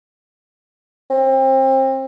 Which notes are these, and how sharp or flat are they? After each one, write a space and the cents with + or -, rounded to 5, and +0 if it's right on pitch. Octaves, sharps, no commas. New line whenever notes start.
C4 +30